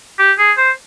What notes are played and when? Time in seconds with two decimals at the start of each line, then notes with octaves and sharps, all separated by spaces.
0.19 G4
0.38 G#4
0.57 C5